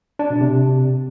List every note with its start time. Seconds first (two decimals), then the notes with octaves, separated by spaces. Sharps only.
0.19 D4
0.30 B2
0.41 C3